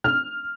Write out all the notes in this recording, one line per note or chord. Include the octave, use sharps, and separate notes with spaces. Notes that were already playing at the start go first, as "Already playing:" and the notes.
F6